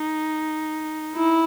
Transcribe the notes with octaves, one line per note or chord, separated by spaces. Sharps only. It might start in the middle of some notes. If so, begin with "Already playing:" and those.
Already playing: D#4
E4